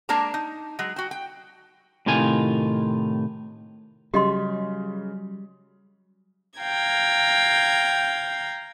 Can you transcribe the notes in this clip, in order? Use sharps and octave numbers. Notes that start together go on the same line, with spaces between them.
G#3 A#3 D4 A#4 A5 A#5
D#4
F#3 G#3
F#4 G5
G5
A2 C3 D#3 F4 G#5
C#3 F#3 G3 G4 D#5 C6
F5 G5 A#5 G#6